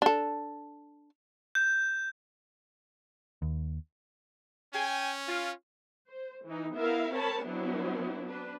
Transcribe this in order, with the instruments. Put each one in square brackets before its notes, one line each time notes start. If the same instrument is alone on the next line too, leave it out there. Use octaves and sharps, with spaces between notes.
[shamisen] D4 A4
[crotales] G6
[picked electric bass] D#2
[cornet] C#4 [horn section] G5 G#5
[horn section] F4
[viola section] C5
E3 D#4
B3 E4 A#4 E5 F5
C4 A#4 C#5 A5 B5
F#3 B3 C4 D4 E4
D4 B4